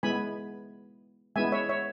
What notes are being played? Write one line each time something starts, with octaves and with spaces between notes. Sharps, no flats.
G#3 B3 E4 G#5 B5
G#3 B3 E4 E5 G#5
C#5 E5
C#5 E5